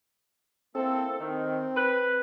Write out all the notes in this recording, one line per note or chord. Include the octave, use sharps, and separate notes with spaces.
A#3 C4 E4 A4
D#3 C4
B4